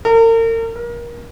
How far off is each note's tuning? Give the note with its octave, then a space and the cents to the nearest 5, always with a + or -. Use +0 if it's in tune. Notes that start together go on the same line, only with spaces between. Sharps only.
A#4 -40
A#4 +25